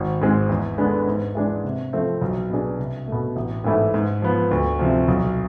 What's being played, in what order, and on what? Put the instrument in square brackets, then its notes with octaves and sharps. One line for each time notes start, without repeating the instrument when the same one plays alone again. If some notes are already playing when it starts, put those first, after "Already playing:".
Already playing: [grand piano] G#1
G#2 G#3 C4
E2
D3 G#3 B3 D4
G#2
E3 G#3 D4
C3
F3 A3 C4
B1
B2 B3 D4 G#4
C2
B2 A3
A1
G#2 E3 A3 E4
G#2
F3 B3
D2
C3 F3
B1